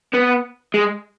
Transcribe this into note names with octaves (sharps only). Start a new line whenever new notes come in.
B3
G#3